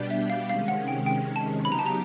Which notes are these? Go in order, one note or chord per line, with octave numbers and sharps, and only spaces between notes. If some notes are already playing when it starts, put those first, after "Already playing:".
Already playing: B2 G3 B3 D4 G4
E5
F5
C3 D#3 G#3 C#4 F5
F#5
G5
G5
A5
C#3 F#3 B3 D#4 G4 B5
A#5
A5
A#5